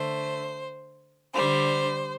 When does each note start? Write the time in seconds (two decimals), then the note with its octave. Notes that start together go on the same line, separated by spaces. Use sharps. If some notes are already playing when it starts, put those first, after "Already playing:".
Already playing: D3 A3 C5
1.33 D3 G3 C5